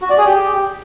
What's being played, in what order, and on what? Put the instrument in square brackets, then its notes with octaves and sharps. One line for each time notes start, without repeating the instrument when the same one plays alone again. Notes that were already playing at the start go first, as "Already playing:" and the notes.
[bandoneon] F#4
D5
G#4
G4